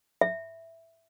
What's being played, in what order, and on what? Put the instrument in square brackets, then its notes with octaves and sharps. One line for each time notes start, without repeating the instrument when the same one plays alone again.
[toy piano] E5